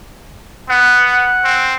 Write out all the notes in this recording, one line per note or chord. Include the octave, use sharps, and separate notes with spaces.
B3 F#5
C4